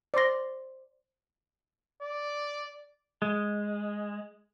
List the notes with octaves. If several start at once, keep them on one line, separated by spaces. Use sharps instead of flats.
C5 D5 C6 A#6
D5
G#3